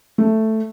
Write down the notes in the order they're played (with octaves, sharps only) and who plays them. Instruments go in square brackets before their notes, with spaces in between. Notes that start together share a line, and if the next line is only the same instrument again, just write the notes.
[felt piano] A3